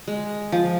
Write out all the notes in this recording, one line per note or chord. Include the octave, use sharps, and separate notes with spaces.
G#3
F3